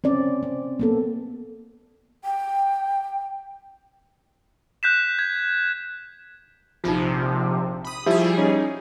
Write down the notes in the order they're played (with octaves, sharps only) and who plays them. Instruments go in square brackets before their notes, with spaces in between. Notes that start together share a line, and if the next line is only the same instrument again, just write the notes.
[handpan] C4 C#4 D5
C4
A#3 B3 A4
[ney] G5
[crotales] F#6 G6 B6 E7
G#6
[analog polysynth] A#1 C3 F3 [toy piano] D#4 F4
[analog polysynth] B5 D#6
[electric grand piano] F3 E4 E5 [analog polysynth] G3 G#4 [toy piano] G4
[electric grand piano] C#4 D#4 C#5